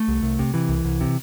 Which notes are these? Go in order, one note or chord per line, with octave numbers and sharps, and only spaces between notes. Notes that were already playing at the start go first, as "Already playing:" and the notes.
Already playing: A3
C2
C2
C3
C3 E3
C2
C2
C3